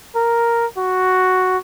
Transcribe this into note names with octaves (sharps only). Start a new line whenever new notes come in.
A#4
F#4